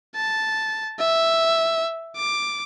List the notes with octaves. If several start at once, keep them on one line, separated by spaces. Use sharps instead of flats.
A5
E5
D6